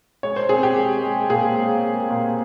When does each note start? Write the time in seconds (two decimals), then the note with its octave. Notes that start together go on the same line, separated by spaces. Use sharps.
0.23 G#3 C#5
0.36 C5
0.49 C4 G#4
0.63 G4
0.77 G#3
1.03 G#3
1.30 A#2 G#4
1.56 G#3
1.84 G#3
2.11 A#2